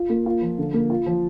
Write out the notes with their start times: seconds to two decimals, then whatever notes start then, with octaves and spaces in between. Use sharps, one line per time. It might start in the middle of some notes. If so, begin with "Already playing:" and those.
Already playing: F4
0.09 A#3
0.26 F4
0.42 F3
0.58 D3
0.74 A#3
0.90 F4
1.06 F3